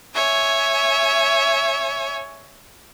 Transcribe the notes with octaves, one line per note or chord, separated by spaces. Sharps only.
C#5 E5 G#5